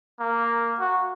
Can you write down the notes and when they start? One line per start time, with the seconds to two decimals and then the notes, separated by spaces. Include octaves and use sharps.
0.20 A#3
0.80 F#4